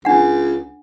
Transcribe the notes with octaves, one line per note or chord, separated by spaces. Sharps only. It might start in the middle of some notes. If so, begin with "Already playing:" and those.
C#2 D4 F#5